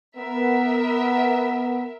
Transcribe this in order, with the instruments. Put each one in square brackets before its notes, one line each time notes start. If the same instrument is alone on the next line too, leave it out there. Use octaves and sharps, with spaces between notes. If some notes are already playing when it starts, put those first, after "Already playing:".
[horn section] B3 [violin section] A#4 E5